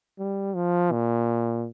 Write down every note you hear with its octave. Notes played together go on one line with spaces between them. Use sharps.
G3
F3
A#2